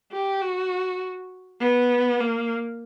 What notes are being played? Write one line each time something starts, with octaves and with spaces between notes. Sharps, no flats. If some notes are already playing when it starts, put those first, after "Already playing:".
G4
F#4
B3
A#3